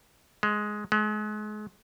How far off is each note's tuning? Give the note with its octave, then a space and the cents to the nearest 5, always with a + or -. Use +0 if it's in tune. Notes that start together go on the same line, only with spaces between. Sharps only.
G#3 +10
G#3 +35